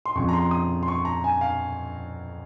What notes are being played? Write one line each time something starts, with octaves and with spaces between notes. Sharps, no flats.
C6
F2 C#3 F3 C#6
A#5
C6
D#6
C6
C#6
A#5
G#5
F5